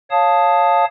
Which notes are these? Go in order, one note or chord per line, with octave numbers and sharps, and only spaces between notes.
C#5 F5 A5 D#6